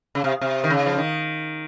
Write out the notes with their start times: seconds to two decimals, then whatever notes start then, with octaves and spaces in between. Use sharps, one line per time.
0.15 C#3
0.24 C3
0.41 C3
0.64 D#3
0.70 C#3
0.86 F3
0.98 D#3